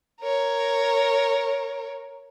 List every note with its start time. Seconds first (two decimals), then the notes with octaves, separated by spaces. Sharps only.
0.21 A#4 C#5